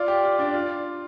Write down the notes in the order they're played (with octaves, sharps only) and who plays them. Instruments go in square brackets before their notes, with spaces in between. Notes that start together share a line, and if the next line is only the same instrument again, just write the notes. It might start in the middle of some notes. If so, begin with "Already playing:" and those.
Already playing: [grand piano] F4 [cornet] D5
[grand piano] G4
F4
D4
F4